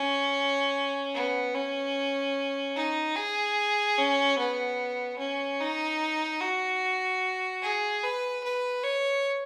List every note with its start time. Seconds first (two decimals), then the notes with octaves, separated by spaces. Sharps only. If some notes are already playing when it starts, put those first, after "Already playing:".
Already playing: C#4
1.14 B3
1.54 C#4
2.76 D#4
3.16 G#4
3.98 C#4
4.39 B3
5.19 C#4
5.61 D#4
6.41 F#4
7.62 G#4
8.03 B4
8.44 B4
8.84 C#5